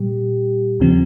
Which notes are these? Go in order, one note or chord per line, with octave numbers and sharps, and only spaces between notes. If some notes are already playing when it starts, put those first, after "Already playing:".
Already playing: A#2 G3 G4
D#2 C#3 F3 C4